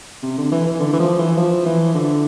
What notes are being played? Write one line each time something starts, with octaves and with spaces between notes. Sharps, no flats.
C3
D3
E3
E3
D3
E3
F3
E3
F3
E3
D3